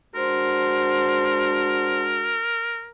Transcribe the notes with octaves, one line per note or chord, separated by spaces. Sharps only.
G#3 D4 F#4 A#4 C5